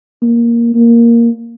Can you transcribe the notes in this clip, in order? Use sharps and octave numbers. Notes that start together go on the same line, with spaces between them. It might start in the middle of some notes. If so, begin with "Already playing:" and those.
A#3
A#3